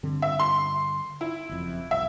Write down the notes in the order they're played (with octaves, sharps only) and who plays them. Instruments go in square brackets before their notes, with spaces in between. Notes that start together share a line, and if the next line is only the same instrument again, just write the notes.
[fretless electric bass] G2 D3 C4
[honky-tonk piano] E5
C6
E4
[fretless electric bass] F#1 F2
[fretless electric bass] C2 [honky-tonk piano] E5